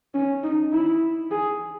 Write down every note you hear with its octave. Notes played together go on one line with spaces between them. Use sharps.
C#4
D#4
E4
G#4